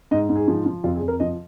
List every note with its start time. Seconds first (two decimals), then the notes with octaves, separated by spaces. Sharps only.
0.11 G#2 D#5
0.29 G#2
0.36 G#4
0.48 F3
0.66 F3
0.84 F2 F4
0.96 G#4
1.02 F2
1.08 A#4
1.20 F3 D#5